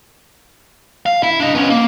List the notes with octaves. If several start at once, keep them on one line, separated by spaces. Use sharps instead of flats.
F5
E4
D4 D#5
B3 C#4
A#3